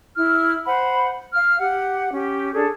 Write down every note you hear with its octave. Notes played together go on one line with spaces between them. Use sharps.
E4 F6
C5 F#5 B5
F5 F6
G4 F#5
C#4 G4
D4 G#4 A4